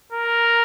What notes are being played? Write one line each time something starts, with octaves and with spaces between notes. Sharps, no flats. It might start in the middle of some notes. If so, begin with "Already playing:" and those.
A#4